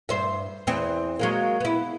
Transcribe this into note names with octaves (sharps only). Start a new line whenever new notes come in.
G2 C5 E5
E2 E3 C4
F#3 G#3 A#3
B3 E4